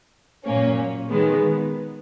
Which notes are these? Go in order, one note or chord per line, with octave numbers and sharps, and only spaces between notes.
A#2 F#3 A#3 C#4
D#3 G#3 B3